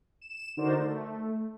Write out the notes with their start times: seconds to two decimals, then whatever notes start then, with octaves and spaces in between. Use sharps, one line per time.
0.21 E7
0.57 D3 D#4 F#4 A#4 C5 D5
0.79 A3